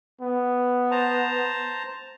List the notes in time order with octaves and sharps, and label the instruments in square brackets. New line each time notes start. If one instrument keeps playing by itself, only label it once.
[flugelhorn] B3
[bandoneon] C5 A5 A#5